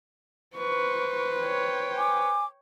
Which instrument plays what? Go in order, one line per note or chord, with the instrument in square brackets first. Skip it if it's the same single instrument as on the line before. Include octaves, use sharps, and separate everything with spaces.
[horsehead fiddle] B4 C5 [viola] C#6
[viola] C#5 G5
[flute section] G#5 D6